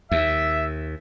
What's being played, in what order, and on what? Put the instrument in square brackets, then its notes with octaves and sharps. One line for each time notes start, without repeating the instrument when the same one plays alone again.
[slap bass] D#2 [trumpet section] E5